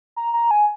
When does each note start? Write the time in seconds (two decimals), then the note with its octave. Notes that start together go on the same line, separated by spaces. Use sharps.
0.16 A#5
0.33 A#5
0.51 G#5